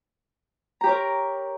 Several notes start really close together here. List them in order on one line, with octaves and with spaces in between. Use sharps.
A#5 G4 C#5 A#4